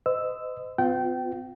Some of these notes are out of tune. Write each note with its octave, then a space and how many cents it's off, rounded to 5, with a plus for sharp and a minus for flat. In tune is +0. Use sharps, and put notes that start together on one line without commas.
C5 -40 D#5 +0 E6 +0
B3 +45 F4 +20 G5 -25